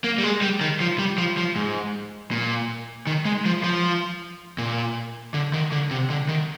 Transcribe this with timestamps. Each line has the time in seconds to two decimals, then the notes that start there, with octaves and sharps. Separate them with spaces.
0.04 A#3
0.18 G3
0.23 G#3
0.42 G3
0.61 D#3
0.80 F3
0.99 G3
1.18 F3
1.37 F3
1.56 G#2
2.31 A#2
3.07 D#3
3.25 G#3
3.45 F3
3.64 F3
4.58 A#2
5.34 D3
5.53 D#3
5.72 D3
5.91 C3
6.10 D3
6.29 D#3